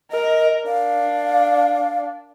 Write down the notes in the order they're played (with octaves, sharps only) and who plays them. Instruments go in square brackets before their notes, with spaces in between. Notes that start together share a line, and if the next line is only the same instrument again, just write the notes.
[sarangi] A#4 [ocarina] D#5
[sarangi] D4 [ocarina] F5